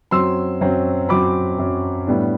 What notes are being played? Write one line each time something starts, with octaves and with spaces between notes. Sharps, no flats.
F#2 F#3 C4 C6 E6
F#2 F#3 C4
F#2 F#3 C4 B5 D6
F#2 F#3 C4
A2 G3 B3 D4